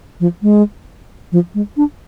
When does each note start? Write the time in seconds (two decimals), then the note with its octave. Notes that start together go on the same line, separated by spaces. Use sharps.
0.20 F3
0.42 G#3
1.32 F3
1.55 G#3
1.77 D4